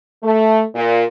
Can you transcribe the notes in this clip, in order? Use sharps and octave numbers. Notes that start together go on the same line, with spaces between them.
A3
A#2